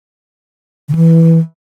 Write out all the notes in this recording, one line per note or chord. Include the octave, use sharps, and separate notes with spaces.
D3
E3